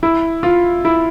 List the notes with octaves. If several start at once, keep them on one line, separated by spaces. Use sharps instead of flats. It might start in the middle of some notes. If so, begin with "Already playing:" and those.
E4
F4
E4